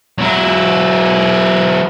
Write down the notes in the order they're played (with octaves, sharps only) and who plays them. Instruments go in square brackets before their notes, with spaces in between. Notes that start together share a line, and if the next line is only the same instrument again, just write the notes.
[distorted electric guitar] F#3 E4